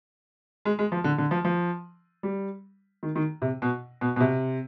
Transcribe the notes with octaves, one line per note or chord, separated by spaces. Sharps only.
G#3
G#3
F3
D3
D3
F3
F3
G3
D#3
D#3
C3
B2
B2
B2
C3